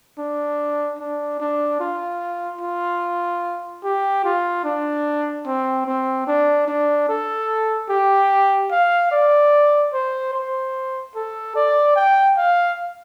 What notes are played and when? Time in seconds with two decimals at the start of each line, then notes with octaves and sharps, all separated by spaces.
0.18 D4
0.99 D4
1.40 D4
1.80 F4
2.61 F4
3.84 G4
4.24 F4
4.64 D4
5.46 C4
5.86 C4
6.27 D4
6.68 D4
7.09 A4
7.89 G4
8.71 F5
9.11 D5
9.93 C5
10.34 C5
11.15 A4
11.55 D5
11.96 G5
12.37 F5